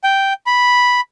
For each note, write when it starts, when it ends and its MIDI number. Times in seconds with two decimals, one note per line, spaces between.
0.04 0.33 79
0.46 1.01 83